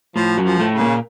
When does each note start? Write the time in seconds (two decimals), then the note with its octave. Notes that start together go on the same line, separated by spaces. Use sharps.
0.16 A2 F3
0.37 F#2 F#3
0.45 F3
0.60 A2 A3
0.74 C#3
0.81 A#2 A#3